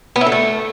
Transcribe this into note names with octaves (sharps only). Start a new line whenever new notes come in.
B3
E4
D3
A3